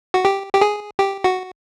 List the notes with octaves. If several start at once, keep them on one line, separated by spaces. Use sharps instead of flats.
F#4
G4
G4
G#4
G4
F#4